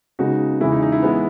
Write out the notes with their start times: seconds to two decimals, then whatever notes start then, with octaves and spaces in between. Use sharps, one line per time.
0.19 C#3 G#3 B3 D#4 F#4
0.61 E2 C#3 E3 G#3 E4
0.72 D#4
0.82 D#4
0.92 E4
1.03 E3 G#3 B3